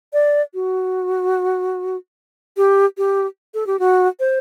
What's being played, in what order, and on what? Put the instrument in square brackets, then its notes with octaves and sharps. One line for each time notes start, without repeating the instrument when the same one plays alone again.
[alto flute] D5
F#4
G4
G4
A4
G4
F#4
C5